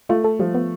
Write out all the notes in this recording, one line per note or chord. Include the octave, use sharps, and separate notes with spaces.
A3 F4
A4
F3 G3
B3